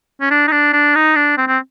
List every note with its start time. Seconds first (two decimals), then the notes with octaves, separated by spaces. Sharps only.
0.21 C#4
0.31 D4
0.48 D#4
0.52 D4
0.73 D4
0.95 D#4
1.16 D4
1.38 C4
1.48 C4